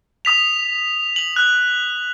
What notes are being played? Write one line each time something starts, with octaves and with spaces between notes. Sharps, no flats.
D#6 B6 F7
F#7
F#6